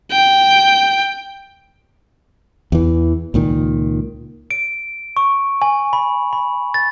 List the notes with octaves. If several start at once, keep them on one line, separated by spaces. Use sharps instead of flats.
G5
E2 E3
C#2 A#2 D#3
D7
C#6
G#5
B5
B5
A6